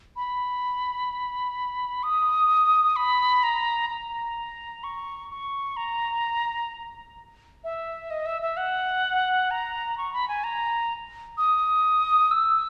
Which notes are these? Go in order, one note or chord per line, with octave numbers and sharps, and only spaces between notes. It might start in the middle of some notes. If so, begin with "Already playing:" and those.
B5
D#6
B5
A#5
A#5
C#6
C#6
A#5
E5
D#5
E5
E5
F#5
A#5
C#6
B5
G#5
A#5
D#6
E6